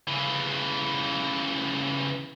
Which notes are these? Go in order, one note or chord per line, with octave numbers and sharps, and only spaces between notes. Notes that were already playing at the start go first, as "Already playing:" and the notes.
C#3 E3